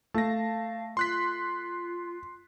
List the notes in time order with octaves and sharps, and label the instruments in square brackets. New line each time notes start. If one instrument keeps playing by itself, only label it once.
[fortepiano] A3 [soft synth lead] F5 [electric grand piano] A5 A#6
[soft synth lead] F4 [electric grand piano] C6 F#6 B6